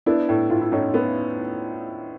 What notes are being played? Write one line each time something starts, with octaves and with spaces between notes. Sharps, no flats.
B3 D4 E4
A2
A2 F4
E4
A2 C#4 D#4
B3